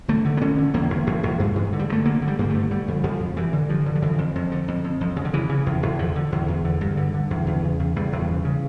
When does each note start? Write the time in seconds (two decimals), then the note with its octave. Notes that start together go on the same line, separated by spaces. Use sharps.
0.08 D3 A3
0.25 D3
0.37 A#3
0.41 D3 C#4
0.58 D3
0.74 E2 A#3
0.90 E2
1.07 E2
1.23 E2
1.40 G2
1.56 G2
1.73 D3
1.79 G3
1.89 G2
1.92 A3
2.05 D3 A#3
2.22 D3
2.28 G3
2.39 G2 A#3
2.50 D3 A3
2.71 D3 G3
2.88 F2
3.03 F2 F3
3.20 F2
3.37 G2 E3
3.53 D3
3.69 G2 F3
3.86 D3
3.95 F3
4.02 F2 E3
4.18 F2
4.35 F2
4.52 D3
4.68 F2
4.84 F2
5.01 F2
5.16 C#3
5.25 D3
5.34 C#3 E3
5.49 C#3
5.66 E2
5.83 E2
5.99 D3 F3
6.16 D3
6.32 E2
6.48 E2
6.65 D3
6.81 G2
6.97 D3
7.14 D3
7.31 E2
7.47 E2
7.64 C#3
7.79 E2
7.96 E2 G3
8.13 E2
8.29 C#3
8.45 C#3